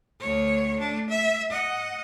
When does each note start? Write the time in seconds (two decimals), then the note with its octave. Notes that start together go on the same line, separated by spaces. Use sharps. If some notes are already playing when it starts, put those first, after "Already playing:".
0.20 D2 C#5
0.79 A3 D4
1.09 E5
1.50 D#5 F#5